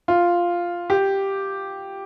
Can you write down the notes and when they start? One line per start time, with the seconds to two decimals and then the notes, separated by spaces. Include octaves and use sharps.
0.08 F4
0.90 G4